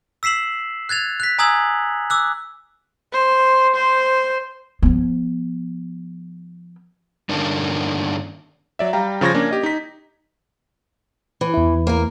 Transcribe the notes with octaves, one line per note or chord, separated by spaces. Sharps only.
E6 B6 C7 E7 F#7
F#6 G#6 A6 F7
F#6 B6
G#5 A#5 D#6 E6 G#6 F#7
D6 E6 F#6
C5
C5
F3 B3
G2 D3 D#3 A#3 C#4 D4
F#3 D5 E5
G3 F5 G5 A#5
C#3 F3 C#6 G#6 A#6
A#3 C#4 D4
G4 D#5
D#4 B6
E3
E2 E4
A#3 A#4